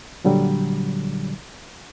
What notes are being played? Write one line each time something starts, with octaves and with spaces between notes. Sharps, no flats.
A#2 D3 F#3 G3